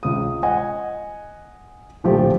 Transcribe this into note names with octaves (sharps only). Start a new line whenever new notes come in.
C#2 D#6
D#5 F#5 G#5 D#6
D1 A#1 F3 A3 C4 G4